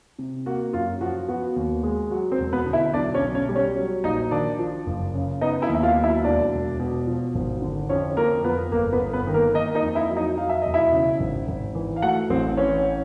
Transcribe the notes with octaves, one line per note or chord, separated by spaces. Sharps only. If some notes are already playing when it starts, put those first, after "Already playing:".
C3
A#3 F#4
F#2 F4
F3 F#4
B3 F#4
D#2
G#3
F#3 F#4
C4 C5
E1
B3 B4
D3
E4 E5
B1 D4 D5
C#4 C#5
B1
C#4 C#5
G3
C#4 C#5
F#3
A#1 D#4 D#5
D#3 D4 D5
F3
F#1
C#3
B3 D#4 D#5
E4 E5
D#2
E5
F4 F5
F#3
E4 E5
E1 D4 D5
E1
B2
F3
G#1
D3
F2 C#4 C#5
F2 A#3 A#4
F3 B3 B4
G1 A#3 A#4
B3 B4
G1
B3 B4
D#3
A#3 A#4
A#3 D#4 D#5
D#4 D#5
F2
E4 E5
F#3
D#4 D#5
F#3 F5
E5
E1 D#5
E4 E5
C#3
G#1
G#1
E3
F5
A3 F#4 F#5
A1 C4 C5
E3 C#4 C#5